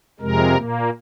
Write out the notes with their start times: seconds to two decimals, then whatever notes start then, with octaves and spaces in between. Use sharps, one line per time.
0.20 F2 C3 G#3 A#4
0.55 A#2 A#3